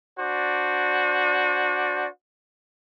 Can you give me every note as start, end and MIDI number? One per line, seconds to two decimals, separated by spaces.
0.19 2.07 62
0.19 2.07 66
0.19 2.07 72
0.19 2.07 74